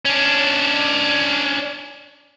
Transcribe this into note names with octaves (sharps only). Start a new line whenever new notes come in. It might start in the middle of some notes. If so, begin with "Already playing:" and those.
C#4 D4